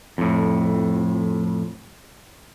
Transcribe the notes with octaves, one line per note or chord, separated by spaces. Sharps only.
F2 A2